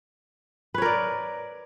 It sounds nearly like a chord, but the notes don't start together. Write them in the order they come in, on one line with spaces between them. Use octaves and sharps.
B4 C#5 A#4 D5